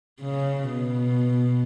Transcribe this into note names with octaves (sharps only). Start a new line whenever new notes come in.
C#3
B2